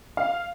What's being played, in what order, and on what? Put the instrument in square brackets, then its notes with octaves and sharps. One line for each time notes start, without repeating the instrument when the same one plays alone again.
[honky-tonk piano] F5